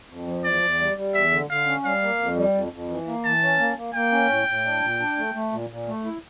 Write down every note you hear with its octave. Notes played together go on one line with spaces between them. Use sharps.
F2
F3
E2 D5
E2
G3
G3
E2 E5
D3
D3 F5
C#4
G3 F5
A#3
F2
G3
F2
F2
E3
A#3
E3 A5
C#4
A#3
A#3
A#3 G5
C#4
A2
A2
D4
A#2
D4
A3
A3
A#2
A#2
A3
E4